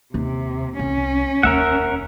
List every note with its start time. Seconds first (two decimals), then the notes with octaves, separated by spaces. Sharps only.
0.14 D#2 C3 D#3
0.79 C2 C#4
1.43 F1 D#2 A#4 E5 F#5